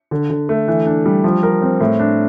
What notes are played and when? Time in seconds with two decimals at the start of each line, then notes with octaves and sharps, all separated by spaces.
0.11 D3
0.30 D3
0.49 A3
0.68 E3
0.86 D4
1.05 G3
1.24 F3
1.43 A#4
1.62 C4
1.81 A2
1.99 D4